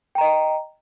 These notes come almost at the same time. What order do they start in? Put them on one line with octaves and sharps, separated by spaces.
G5 A#5 D#5